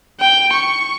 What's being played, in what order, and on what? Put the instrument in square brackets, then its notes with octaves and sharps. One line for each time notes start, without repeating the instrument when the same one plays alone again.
[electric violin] G5
C#6